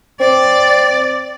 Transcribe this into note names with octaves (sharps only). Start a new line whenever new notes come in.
C4 D5